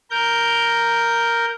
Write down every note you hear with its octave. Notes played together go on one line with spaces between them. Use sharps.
A#4 G6